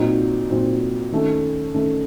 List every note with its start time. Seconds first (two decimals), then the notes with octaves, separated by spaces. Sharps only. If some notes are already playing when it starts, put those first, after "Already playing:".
Already playing: A#2 F#3 C4 D#4
0.49 A#2 F#3 C4 D#4
1.12 D#3 A3 C#4
1.74 D#3 A3 C#4